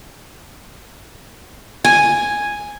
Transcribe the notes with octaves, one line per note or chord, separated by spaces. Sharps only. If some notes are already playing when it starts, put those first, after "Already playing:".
G#5